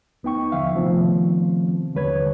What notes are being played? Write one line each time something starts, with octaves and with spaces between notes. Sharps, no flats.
D2 B3 D#4 G5 C#6
D#2 D3 F3 E5 F5
C3 D#3 F3 A3 B3 C4
D#2 D3 G3 B4 C#5 G#6